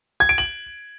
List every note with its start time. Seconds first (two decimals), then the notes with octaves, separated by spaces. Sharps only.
0.20 G#6
0.29 D7
0.38 F#7